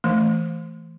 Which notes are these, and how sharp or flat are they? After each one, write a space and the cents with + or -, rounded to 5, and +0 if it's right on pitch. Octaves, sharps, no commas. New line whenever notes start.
E3 +0 A3 +0